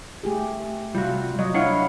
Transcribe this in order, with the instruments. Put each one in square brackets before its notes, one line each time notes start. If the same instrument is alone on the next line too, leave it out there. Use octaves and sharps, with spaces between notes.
[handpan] A3 G4 G#4
[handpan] C3 F4 [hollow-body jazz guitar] G3 F#4
[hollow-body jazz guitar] F#3 [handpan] D#5
[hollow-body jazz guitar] D4 C#5 [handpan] E4 F5 F#5